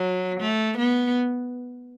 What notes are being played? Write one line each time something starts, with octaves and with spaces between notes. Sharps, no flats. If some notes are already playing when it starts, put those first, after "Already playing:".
Already playing: F#3
A3
B3